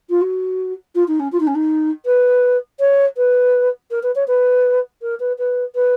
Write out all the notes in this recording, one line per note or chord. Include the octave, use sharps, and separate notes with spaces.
F4
F#4
F4
D#4
C#4
F4
D#4
C#4
D#4
B4
C#5
B4
A#4
B4
C#5
B4
A#4
B4
B4
B4